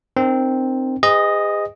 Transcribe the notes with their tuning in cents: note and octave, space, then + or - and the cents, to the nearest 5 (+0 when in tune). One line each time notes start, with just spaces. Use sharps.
C4 +0 D#4 -40 A#4 +0
G#4 -35 B4 +40 D#5 +0